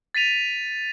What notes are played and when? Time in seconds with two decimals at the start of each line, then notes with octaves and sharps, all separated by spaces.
0.15 A6 B6 D#7 F7